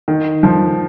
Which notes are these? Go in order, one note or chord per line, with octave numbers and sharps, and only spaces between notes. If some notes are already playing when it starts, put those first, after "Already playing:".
D#3
F3